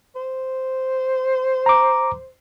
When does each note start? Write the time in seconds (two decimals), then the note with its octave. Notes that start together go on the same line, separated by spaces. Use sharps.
0.16 C5
1.66 A#5 D6